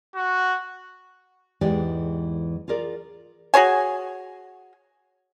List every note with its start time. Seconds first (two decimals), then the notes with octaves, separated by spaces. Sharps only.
0.15 F#4
1.61 E2 G#2 E3 G#3 G4 D5
2.68 F4 G#4 A#4 D5
3.54 F#4 G#4 C#5 G#5